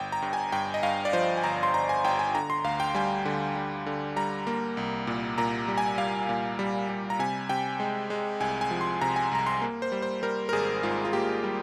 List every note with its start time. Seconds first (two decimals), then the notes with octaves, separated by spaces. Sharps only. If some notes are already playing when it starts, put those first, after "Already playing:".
Already playing: G1 G5
0.12 A#5
0.22 G2
0.33 G#5
0.52 G2 G5
0.74 D#5
0.83 G2 F5
1.05 D5
1.13 F3 C5
1.37 G#5
1.44 G1 A#5
1.63 C6
1.74 G1 A#5
1.89 G#5
2.04 G1 G5
2.19 G#5
2.35 D3 A#5
2.50 C6
2.64 D2 F5
2.80 G5
2.95 G3 G#5
3.25 D3
3.56 G3
3.86 D3
4.16 G3 A#5
4.47 A#3
4.77 C2
5.07 A#2
5.38 A#2 A#5
5.68 G3
5.78 G#5
5.98 G3 F5
6.29 A#2
6.59 G3
6.89 G3
7.10 A#5
7.19 C3 G#5
7.49 C3 G5
7.80 G#3
8.10 G#3
8.40 C2 G#5
8.61 G#5
8.71 F3
8.81 C6
9.01 C3 A#5
9.16 G#5
9.32 C2 A#5
9.47 C6
9.62 A#3
9.82 C5
9.92 G3
10.02 C5
10.23 G3 A#4
10.49 A#4
10.53 G#1 G#4
10.83 G#2 F4
11.05 F4
11.13 A#3 G4
11.44 G3